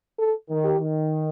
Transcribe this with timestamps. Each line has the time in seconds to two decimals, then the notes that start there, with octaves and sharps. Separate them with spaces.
0.19 A4
0.49 D#3
0.64 G4
0.80 D#3